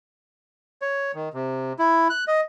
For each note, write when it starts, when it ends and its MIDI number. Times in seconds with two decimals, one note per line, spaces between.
0.82 1.12 73
1.15 1.29 51
1.34 1.73 48
1.79 2.08 64
2.10 2.24 90
2.28 2.41 75